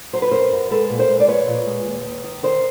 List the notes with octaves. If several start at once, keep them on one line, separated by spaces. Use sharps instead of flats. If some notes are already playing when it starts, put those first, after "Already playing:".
F#3 C5
B4
F#2 A#4 C5
F#2
G#3 A4 B4
A#2
A#4 C5
G#3
D5
F3 B4 C#5
A#2
G#3
D#2
D#2
D#3
D#3 A#4 C5